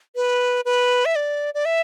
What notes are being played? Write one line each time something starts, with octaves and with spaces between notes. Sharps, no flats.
B4
B4
E5
D5
D5
E5